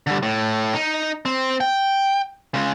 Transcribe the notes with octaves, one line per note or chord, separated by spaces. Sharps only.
D3 G3
A2
D#4
C4
G5
C#3 G#3